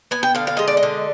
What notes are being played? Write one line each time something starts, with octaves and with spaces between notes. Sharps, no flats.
B3 G#5
G5
D3 F5
F5
G#3 D#5
D5
D#5
D3